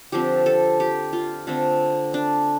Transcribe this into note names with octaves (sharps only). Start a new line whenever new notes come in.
D3 F3 C4 G4
A4
G4
F4
D3 A3 C4
D4